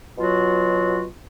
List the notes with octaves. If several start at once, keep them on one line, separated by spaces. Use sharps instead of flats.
B2 F#3 F4 F#4